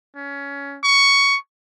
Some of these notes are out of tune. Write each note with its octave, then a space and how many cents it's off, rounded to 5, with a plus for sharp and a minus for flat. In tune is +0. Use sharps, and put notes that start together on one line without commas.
C#4 +20
C#6 +10